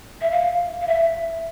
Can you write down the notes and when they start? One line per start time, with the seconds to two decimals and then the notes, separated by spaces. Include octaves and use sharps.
0.21 E5
0.31 F5
0.81 F5
0.87 E5